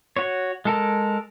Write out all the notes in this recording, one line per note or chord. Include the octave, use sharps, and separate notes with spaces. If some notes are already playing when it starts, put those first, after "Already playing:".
F#4 C#5
G#3 A4 A#4